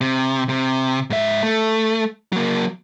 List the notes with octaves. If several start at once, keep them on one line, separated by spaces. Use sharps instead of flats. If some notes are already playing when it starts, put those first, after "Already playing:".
C3
C3
G#2 E5
A3
F#3 A#3